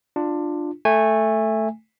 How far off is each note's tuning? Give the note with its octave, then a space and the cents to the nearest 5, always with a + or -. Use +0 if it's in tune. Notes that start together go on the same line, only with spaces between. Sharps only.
D4 +15 F4 +0
A3 +0 G#5 -20